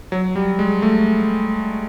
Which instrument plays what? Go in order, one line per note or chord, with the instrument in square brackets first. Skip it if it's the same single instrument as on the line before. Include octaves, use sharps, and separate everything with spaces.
[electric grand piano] F#3
G3
G#3
A3